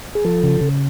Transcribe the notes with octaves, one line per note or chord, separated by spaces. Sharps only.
G#4
F3 A4
C#3
C#3